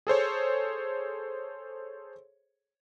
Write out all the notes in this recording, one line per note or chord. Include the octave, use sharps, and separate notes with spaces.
G#4 A4 C5 C#5